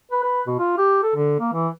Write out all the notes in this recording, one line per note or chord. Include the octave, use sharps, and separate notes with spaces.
B4
B4
B2
F4
G4
A4
D3
A#3
E3